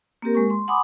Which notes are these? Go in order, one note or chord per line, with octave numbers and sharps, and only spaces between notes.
A#3 C4 G4 A#4
G#3 C#6
C6
F#5 G#5 B5 C6 D6 D#6